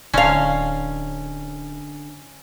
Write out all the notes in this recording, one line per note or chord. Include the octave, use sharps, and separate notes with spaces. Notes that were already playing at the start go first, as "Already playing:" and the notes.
D1 D3 C#4 F5